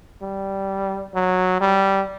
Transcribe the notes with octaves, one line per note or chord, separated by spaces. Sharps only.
G3
F#3
G3